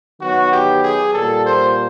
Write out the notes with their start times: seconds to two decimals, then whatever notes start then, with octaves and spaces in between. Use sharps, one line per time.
0.20 D#3 F#3 B3 F#4
0.52 G4
0.83 G#4
1.13 A#2 G3 A#3 A4
1.45 C5